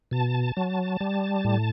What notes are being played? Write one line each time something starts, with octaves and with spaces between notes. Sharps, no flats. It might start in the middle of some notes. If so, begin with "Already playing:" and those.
B2 A5
F#3
G3
A2